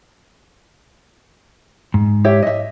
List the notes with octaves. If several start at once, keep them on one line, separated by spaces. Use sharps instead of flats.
G#2
G4 C#5 E5
D#5 E5